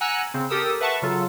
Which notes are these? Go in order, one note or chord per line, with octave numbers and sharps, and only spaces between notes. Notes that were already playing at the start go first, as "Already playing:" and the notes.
F#5 G#5 A#5 E6 F#6
C#3 C4
G4 A4 A#4 D#6 E6
B4 E5 F#5 A5 C#6
C#3 F#3 F4 A4